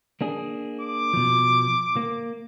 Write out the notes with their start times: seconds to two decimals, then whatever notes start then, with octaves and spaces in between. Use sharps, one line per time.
0.21 A#3 D4 G#4
0.81 D6
1.13 B2 F3
1.96 A#3